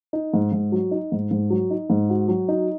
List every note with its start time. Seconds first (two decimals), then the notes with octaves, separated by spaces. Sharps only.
0.13 D#4
0.33 G#2
0.52 G#2
0.72 F#3
0.91 D#4
1.12 G#2
1.31 G#2
1.50 F#3
1.70 D#4
1.90 G#2
2.10 F#4
2.28 F#3
2.48 D#4